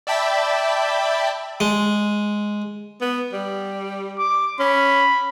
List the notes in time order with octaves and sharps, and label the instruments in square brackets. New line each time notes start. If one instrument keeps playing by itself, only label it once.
[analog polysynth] D5 E5 G5 A5 B5
[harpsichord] G#3
[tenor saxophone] B3
G3
[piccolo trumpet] D6
[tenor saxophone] C#4 [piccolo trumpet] B5